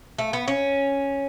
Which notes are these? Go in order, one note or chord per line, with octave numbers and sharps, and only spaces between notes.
A3
B3
C#4